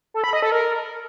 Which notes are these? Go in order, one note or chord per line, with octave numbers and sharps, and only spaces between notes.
A4
B5
D#5
A4
A#4